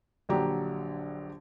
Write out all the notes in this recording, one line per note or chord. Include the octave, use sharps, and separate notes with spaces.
A#1 D3 F#3 G4 A#5